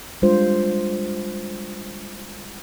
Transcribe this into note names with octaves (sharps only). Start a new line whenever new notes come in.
G3 G#3 D4 F4 C5